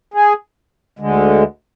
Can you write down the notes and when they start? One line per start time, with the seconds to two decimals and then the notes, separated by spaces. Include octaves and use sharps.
0.14 G#4
0.99 D2 D3 G#3